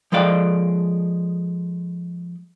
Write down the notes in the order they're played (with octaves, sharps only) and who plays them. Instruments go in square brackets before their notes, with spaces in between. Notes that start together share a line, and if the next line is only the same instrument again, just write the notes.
[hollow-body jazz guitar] F3 G#3 A4 D5 F5